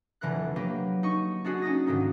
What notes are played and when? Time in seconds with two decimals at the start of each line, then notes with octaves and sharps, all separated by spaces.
0.21 F1 D3 E3 A#4 F#6
0.56 F#3 A#3 B3 G4
1.03 D#4 C#6
1.44 D4 D#4 F#4 G#4
1.62 C#4 D#4 D#6 A#6
1.86 G#2 D3 D#3 A#3 D#4